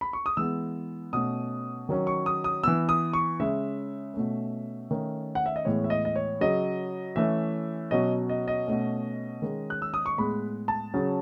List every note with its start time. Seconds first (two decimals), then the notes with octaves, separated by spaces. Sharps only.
0.01 B5
0.13 C#6
0.26 D#6
0.37 E3 G#3 B3 E6
1.13 B2 A3 C#4 D#6
1.89 D#3 F#3 C#4
2.07 C#6
2.26 D#6
2.44 D#6
2.63 E3 B3 E6
2.89 D#6
3.13 C#6
3.40 C#3 G#3 C#4 E5
4.14 B2 A3 C#4
4.90 D#3 A3 C#4
5.35 F#5
5.46 E5
5.56 D#5
5.65 A2 E3 G#3 B3 C#5
5.84 E5
5.90 D#5
6.05 D#5
6.15 C#5
6.41 C#3 F#3 C#4 D#5
7.16 E3 A3 C#4 E5
7.91 B2 F#3 C#4 D#5
8.29 D#5
8.48 D#5
8.67 B2 A3 C#4
9.42 D#3 G#3 C#4
9.70 F#6
9.82 E6
9.94 D#6
10.06 C#6
10.17 A2 G#3 B3 B5
10.68 A5
10.94 C#3 F#3 C#4